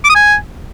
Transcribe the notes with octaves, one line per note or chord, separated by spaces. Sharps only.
D6
D#6
G#5